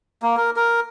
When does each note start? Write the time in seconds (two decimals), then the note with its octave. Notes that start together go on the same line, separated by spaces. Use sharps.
0.22 A#3
0.37 A#4
0.56 A#4